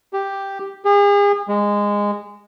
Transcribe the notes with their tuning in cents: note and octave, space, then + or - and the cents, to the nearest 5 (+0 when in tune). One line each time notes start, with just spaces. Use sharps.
G4 +0
G#4 -40
G#3 -15